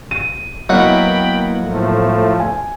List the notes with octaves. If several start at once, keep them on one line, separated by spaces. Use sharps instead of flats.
D#7
F#3 A#3 B3 E4 D#5 F#5 G5 B5
A2 F3 A3
G#5